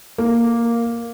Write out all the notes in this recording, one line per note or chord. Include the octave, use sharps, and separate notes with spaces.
A#3